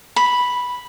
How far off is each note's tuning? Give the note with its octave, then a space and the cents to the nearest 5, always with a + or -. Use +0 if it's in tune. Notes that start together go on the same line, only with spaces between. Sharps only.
B5 -5